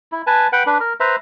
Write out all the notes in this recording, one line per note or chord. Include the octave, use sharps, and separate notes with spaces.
E4
B4 G#5 A5
B4 F#5 G5
D4 B4
A#4
B4 C5 E5 A#5